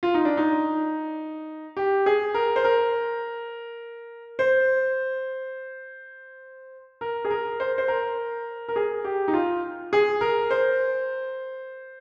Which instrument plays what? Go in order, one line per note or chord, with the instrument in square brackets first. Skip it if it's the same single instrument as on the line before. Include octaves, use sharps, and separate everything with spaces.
[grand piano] F4
D#4
D4
D#4
G4
G#4
A#4
C5
A#4
C5
A#4
G#4
A#4
C5
C5
A#4
A#4
G#4
G4
D#4
F4
G#4
A#4
C5